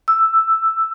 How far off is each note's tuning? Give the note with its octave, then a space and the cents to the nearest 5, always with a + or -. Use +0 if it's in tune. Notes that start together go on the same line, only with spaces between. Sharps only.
E6 +5